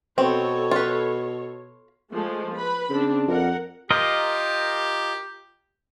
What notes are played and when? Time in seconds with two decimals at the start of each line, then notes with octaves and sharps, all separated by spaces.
0.18 B2 C4 A4 C#5
0.71 F4 B4
2.11 F3 G#3 A3
2.56 B4 B5
2.90 C#3 C4 D4
3.28 F2 A#4 F#5
3.90 F4 G4 A#4 D#5